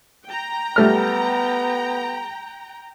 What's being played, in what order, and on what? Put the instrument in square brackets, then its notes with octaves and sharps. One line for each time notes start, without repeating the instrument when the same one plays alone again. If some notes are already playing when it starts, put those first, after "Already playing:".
[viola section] G5 A#5
[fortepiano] G3 A3 F6 [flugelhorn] B3